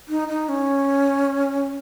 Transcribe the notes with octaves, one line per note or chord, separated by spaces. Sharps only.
D#4
D#4
C#4